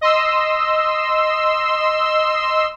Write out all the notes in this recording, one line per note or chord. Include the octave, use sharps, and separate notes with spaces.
D#5 C6 E6